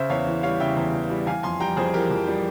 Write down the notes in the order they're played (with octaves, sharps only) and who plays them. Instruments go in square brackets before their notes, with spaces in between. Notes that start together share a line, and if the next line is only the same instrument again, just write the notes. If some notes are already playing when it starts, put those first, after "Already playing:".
Already playing: [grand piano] C#3 C5 E5
E2 C#5 F5
E3
G3 C#5 F5
C#3 E5 G5
E2
E3
G3
E3 F5 G#5
F2 G#5 C6
G3 G5 A#5
F2 G#4 C5
E3 G4 A#4
F2
G3